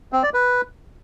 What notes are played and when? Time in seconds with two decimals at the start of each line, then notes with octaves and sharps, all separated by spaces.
0.12 C4
0.23 D5
0.34 B4